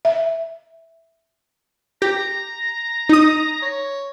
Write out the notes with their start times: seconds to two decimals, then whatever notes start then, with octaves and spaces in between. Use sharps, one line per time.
0.05 E5
2.02 G4 A#5
3.09 D#4 D#6
3.62 C#5